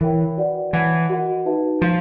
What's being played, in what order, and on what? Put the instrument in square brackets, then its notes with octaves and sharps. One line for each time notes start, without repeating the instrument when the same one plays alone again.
[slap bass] E3 [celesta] A#4 C#5 E5 G5
[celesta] F#4 B4 D5 F#5
[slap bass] E3 [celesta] C#5 F#5 A5
[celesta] F#4 A#4 D#5 F#5
D#4 F#4 B4 E5 A5
[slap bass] F3 [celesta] F5 A5